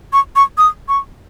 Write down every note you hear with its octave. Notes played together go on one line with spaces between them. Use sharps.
C#6
C#6
D#6
C#6